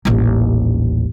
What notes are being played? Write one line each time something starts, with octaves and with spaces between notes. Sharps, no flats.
D#1 A1